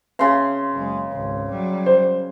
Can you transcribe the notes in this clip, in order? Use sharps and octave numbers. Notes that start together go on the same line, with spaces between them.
C#3 C6
F#1 G#3
G#1 C#2
F#3 G3
C5